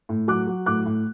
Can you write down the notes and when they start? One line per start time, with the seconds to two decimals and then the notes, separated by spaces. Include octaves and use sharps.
0.09 A2
0.28 F#3 D6 F#6
0.47 F#3
0.66 A2 D6 F#6
0.86 A2